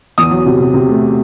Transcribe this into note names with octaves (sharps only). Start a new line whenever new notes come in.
E2 D#6
F#3
C3
C3
C3
A3